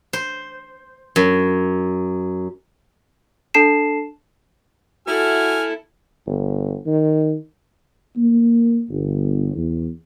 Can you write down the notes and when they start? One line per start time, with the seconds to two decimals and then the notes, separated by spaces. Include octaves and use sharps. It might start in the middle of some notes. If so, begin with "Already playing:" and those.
0.13 C5
1.16 F#2
3.54 D4 A4 A5 C7 E7
5.07 E4 F#4 A4 G#5 F6
6.26 G1
6.86 D#3
8.16 A#3
8.89 G1
9.55 E2